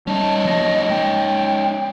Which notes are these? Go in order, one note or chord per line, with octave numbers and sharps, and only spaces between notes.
G3 C#4 D#4 A5
F3 F#3 A#3 D#5
G#3 G5